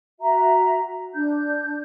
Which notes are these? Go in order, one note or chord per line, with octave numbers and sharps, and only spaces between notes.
F#4 E5 A#5
D4 G6